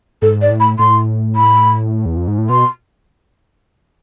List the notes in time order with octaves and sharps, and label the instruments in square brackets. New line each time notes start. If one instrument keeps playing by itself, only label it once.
[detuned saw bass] G#2 [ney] A4
[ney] D5
[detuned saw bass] A2
[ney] B5
[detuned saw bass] A2 [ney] C6
[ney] B5
[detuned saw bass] E2
F2
G#2
A2
[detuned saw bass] B2 [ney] C6